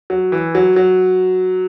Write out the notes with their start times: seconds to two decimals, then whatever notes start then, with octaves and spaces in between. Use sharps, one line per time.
0.10 F#3
0.32 E3
0.55 F#3
0.76 F#3